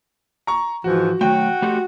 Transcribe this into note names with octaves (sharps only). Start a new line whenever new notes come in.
A#5 C#6
G#2 E3 F3 F#4
D#3 F#3 A3 F#4 G5
A3 G4 A4